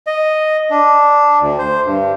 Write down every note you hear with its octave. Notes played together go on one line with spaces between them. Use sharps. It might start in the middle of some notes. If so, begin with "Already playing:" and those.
D#5
D4
D2
C5
G2